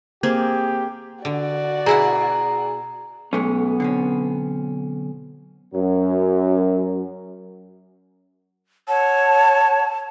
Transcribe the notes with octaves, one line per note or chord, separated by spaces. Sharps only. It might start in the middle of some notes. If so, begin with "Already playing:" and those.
A#3 C4 G4 G#4
D3 F#4 D5
B2 E4 G#4 F#5 A#5
B1 G#3 A3 B3 C#4
D3 C4 C#4
F#2 F#3
C#5 F#5 A5